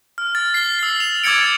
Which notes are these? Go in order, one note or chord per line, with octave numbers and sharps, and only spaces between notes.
F6
F6 A6
C7 G7
E6 C7
F7
D6 E6 G#6 A6 C#7 D7